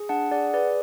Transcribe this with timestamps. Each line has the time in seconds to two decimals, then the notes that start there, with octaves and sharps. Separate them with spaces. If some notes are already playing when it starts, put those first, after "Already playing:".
Already playing: G#4
0.09 D4 F#5 A5
0.31 G#4 D5 F#5
0.54 G#4 B4 D5